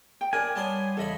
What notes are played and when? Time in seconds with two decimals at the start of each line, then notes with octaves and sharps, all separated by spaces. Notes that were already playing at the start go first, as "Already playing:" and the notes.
0.21 G5
0.33 D4 A#4 D5 G#5
0.56 G3 B3 C#5 D5 A5 C6
0.97 E2 C#3 A4 D#5 B5